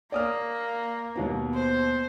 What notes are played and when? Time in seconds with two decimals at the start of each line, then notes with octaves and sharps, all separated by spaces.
0.12 A#3 D5 D#6 F6
1.15 D#2 B2 B3
1.55 C5